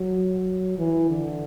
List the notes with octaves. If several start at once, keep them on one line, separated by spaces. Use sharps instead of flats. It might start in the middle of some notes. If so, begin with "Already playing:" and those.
Already playing: F#3
E3
D3